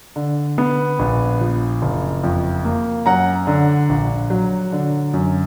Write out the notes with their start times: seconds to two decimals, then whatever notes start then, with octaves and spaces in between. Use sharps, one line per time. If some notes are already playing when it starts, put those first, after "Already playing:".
0.16 D3
0.58 B3
0.99 A#1
1.41 F3
1.82 F#1
2.24 F2
2.65 A#3
3.06 F#2 F#5 A#5
3.47 D3
3.89 A#1
4.30 F#3
4.72 D3
5.13 F#2